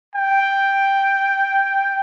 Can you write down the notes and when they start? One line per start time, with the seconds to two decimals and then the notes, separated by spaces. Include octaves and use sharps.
0.16 G5